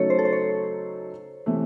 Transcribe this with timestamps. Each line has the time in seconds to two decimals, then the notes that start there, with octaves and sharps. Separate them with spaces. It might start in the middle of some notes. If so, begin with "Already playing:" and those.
Already playing: C#3 F#3 A3 D#4 A4 C#5
0.10 C5
0.18 A4
0.25 C5
0.33 C#5
1.46 C3 E3 A3